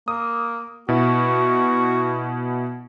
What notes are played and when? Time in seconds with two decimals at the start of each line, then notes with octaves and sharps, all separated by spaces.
0.08 A#3 D#6
0.89 B2 E4 F#4